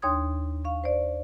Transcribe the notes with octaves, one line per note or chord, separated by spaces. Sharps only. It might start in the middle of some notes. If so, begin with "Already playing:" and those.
D#2 D4 C#5 C6 D#6 G#6
F5 C#6
C5 D5